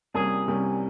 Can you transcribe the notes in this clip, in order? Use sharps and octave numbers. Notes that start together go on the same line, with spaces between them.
C2 C3 G3 A#3 C#4 G#4
C2 C3 G3 A#3 C#4